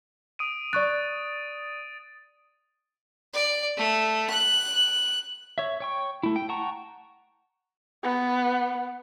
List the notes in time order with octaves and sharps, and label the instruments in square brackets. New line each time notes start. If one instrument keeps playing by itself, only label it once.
[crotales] D#6 D7 D#7
[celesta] D5 C#6 F#6 [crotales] A6
[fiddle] D5
A3
F#6
[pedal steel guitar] C#5 E5
C#5 G5 C#6
A3 E4
G5
F#5 G5 A5 A#5 C#6
[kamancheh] B3